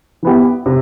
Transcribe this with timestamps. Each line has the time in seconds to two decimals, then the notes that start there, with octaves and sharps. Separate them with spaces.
0.23 E3 B3 E4 G4
0.66 C3